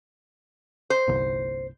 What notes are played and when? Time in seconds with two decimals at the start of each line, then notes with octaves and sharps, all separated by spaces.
0.90 C5
1.08 G1 C2